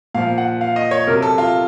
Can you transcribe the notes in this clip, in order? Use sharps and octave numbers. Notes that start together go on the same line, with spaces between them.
A#2 F3 F5
F#5
F5
D#5
C#5
C3 F#3 A#4
A4
F4